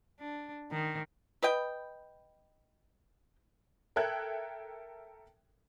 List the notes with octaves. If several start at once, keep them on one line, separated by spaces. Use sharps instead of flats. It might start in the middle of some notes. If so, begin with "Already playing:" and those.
D4
D#3
B4 D#5 G5
A4 A#4 E5 G5 F#6 G#6